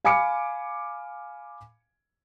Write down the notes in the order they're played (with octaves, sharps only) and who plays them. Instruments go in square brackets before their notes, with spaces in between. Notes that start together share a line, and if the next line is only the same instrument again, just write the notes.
[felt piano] F5 G#5 B5 D6 C#7